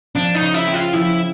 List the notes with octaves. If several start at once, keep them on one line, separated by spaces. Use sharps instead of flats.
F3 D4
D#4
C#3
E4
C4
F4
F3 E4